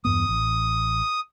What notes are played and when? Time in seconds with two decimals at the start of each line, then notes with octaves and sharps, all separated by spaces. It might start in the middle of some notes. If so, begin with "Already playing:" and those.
0.05 E2 G2 B3 D#6
0.29 A1